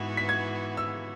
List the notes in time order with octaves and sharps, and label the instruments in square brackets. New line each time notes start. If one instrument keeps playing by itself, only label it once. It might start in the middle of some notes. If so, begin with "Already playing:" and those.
Already playing: [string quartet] G#2 E3 B3 F#4
[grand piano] B6
G#6
E6